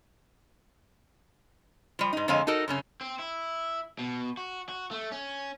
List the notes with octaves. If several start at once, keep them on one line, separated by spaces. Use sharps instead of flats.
F3 G3
G#2 D#4
F2 D3 G#3 C#5 F5 G#5
D#4 F#4 A4 A#4
F#2 C#3 C#4
C4
E4
B2
F#4
F#4
A3
C#4